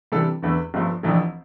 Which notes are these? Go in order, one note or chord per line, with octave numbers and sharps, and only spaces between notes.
C3 E3 G3 D4 A4
E2 D3 A3 E4 B4
G1 G2 F3 A3
F1 F2 E3 A3 D4